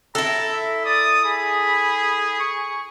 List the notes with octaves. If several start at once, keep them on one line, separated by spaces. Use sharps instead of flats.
E4 A4 A#5
E5
D5 D#6
G#4 B5
C#6